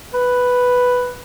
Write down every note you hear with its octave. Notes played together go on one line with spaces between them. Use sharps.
B4